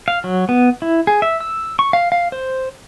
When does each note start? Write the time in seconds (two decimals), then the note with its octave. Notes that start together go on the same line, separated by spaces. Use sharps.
0.08 F5
0.24 F#3
0.49 B3
0.82 E4
1.07 G#4
1.22 E5
1.40 E6
1.79 C#6
1.93 F5
2.12 F5
2.32 C5